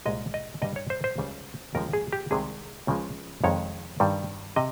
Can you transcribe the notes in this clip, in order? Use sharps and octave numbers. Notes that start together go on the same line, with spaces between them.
C2 A#2 G#3 D#5
D#5
G2 G3 D#5
C#5
C5
C5
C#2 C#3 G3
D#2 C#3 F3 G#3 A#4
G#4
G4
C2 C3 D#3 G#3 G#4
C#2 C#3 F3 G#3
F2 C3 D#3 G#3 C#5
G2 D#3 G3
C3 D#5